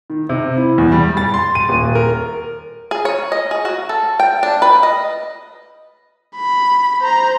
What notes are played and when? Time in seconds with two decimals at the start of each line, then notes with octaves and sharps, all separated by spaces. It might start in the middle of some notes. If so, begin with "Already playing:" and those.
0.10 D#3
0.29 C3
0.57 E4
0.78 E2
0.92 G3
1.17 A6
1.34 C6
1.55 D#7
1.69 D#1
1.95 A#4
2.91 G#4
3.05 C#5
3.32 D#5
3.51 G#4
3.65 F#4
3.89 A4
4.20 G5
4.43 D4
4.62 B4
4.83 D#5
6.36 B5
7.01 C5 A#5